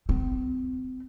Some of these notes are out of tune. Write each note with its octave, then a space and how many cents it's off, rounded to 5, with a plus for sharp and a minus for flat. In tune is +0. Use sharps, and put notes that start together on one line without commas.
C4 -35